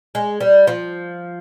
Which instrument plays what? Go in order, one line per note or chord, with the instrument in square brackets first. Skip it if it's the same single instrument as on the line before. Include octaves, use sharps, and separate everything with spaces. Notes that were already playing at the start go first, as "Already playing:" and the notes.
[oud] G#3
G3
F3